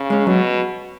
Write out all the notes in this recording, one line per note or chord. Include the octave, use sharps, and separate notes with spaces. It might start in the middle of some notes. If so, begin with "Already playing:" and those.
Already playing: C#3
G#3 C#4
B2 F#3